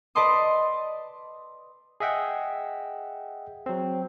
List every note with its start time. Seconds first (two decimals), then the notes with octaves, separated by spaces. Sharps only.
0.15 B4 D5 D#5 A5 C6 D#6
2.00 G#4 D#5 E5 F#5 G5
3.66 F#3 C4